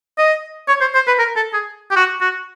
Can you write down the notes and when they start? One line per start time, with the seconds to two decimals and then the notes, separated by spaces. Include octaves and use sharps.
0.18 D#5
0.68 C#5
0.81 C5
0.95 C5
1.07 B4
1.19 A#4
1.36 A4
1.54 G#4
1.91 G4
1.96 F#4
2.21 F#4